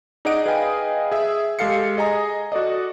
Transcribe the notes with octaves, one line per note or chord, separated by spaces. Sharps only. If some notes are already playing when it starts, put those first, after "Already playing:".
D#4 G#4 D5 D#5 F#5 D7
G#4 B4 D#5 F5 G5 G#5
G#4 E5
G#3 G4 A4 F5 C7 C#7
G#4 D#5 G#5 A#5
F#4 A4 D5 D#5